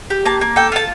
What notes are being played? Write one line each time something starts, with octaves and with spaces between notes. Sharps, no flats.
G4
A#3 A5
A#3
A4 G5
F4 A5